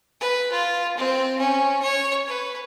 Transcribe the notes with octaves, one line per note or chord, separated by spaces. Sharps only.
B4
F4
C4
C#4
C#5
B4